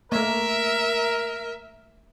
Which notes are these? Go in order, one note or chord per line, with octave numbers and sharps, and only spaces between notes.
A3 A#3 A#4 E5